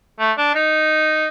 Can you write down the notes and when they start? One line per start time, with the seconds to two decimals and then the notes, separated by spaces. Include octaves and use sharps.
0.20 A3
0.38 D4
0.55 D#4